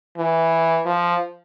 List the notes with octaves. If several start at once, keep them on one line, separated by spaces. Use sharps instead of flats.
E3
F3